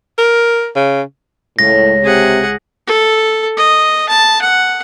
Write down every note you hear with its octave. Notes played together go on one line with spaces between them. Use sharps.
A#4
C#3
C#2 A2 C#3 A#6
C3 G#4 F#5
A4
D#5
A5
F#5